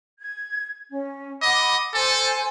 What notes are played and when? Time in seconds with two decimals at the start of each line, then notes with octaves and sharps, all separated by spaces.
0.20 G#6
0.90 C#4
1.42 D#5 F#5 B5 D6
1.94 A4 C5 G#5 C6